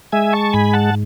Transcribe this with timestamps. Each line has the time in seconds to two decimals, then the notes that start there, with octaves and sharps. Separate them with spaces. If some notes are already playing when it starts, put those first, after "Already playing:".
0.12 G#3 E5 G#5
0.33 A5 C#6
0.53 G#2 G#5 B5
0.73 F#5 A5